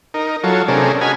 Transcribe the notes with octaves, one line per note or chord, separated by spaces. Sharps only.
D#4 A#4
F#3 F4 A4 C#5
C3 A3 C#4 D4 G#4 A#4
F#4 G#4 D#5 G#5 B5 F6